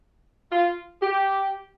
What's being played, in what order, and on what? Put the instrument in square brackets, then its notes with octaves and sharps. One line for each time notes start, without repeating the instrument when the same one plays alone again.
[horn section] F4
G4